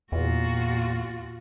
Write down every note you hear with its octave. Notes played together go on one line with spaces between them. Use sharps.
E2 A#2 F4 F#4